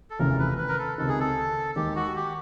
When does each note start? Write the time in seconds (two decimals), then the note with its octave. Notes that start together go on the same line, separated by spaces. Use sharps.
0.10 A4
0.19 F1 D#2 C#3 E3 A#4
0.39 B4
0.58 B4
0.69 A#4
0.79 A4
0.98 C#2 C3 D#3 A4
1.08 G#4
1.20 A4
1.76 D#2 D#3 G#3 G4
1.96 F#4
2.16 G4